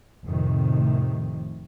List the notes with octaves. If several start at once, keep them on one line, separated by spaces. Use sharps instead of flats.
F1 F2 A2 C3 D#3